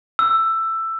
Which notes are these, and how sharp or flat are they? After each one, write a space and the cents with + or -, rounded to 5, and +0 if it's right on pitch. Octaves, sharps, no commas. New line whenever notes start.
E6 +10